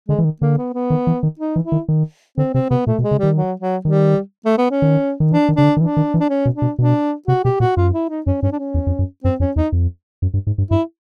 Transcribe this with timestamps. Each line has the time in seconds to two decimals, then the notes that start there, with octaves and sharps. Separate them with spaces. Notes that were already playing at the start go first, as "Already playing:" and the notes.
0.08 D3 G#3
0.19 E3
0.24 D#3
0.41 D3 A#3
0.58 B3
0.74 B3
0.90 D#3
1.07 E3
1.23 D#3
1.39 D#4
1.56 E3
1.64 E4
1.72 D#3
1.88 D#3
2.38 D3 C4
2.54 C3 C4
2.70 C3 B3
2.86 A#2 A3
2.99 B2
3.03 G#3
3.11 C#3
3.19 D#3 G3
3.36 F#3
3.60 F#3
3.85 D#3 G3
4.45 A3
4.58 B3
4.71 C#4
4.82 D#3
5.20 D#3
5.31 E3 D4
5.49 D#3
5.57 C#3 D4
5.64 D3
5.77 D#3
5.80 E3 D4
5.97 D#3
6.14 E3
6.20 D4
6.29 C#4
6.45 B2
6.54 D4
6.62 B2
6.79 B2 D4
7.28 C3 F#4
7.44 B2 G4
7.60 A#2 F#4
7.77 F#2 F4
7.93 E4
8.09 D#4
8.26 F#2 C#4
8.42 G2 C#4
8.52 D4
8.59 C#4
8.74 E2
8.87 F2
8.99 F#2
9.24 F#2 C4
9.40 F2 C#4
9.56 E2 D#4
9.72 F2
10.22 F#2
10.34 G2
10.47 G#2
10.58 G2
10.71 G2 E4